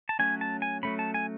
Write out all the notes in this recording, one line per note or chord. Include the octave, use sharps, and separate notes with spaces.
A5
F#3 A3 C#4 G#5
A5
G#5
F#3 A3 C#4 B5
A5
G#5